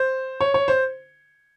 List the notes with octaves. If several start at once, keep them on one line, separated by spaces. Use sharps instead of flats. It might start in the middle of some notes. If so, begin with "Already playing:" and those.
Already playing: C5
C#5
C#5
C5